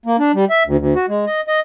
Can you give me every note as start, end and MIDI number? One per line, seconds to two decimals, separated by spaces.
0.06 0.16 58
0.19 0.32 62
0.34 0.45 55
0.50 0.63 76
0.66 0.77 38
0.78 0.94 38
0.95 1.06 66
1.09 1.25 56
1.26 1.41 75
1.48 1.60 75